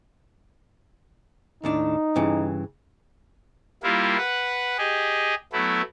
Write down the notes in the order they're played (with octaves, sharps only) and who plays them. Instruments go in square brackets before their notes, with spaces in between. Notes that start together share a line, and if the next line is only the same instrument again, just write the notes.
[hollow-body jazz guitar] D#2 A2 D4 [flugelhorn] D#4
[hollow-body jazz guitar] G2 C#3 E3
[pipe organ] G3 A#3 E4 F4
B4 F#5
G4 G#4 D#5
F#3 A3 B3 E4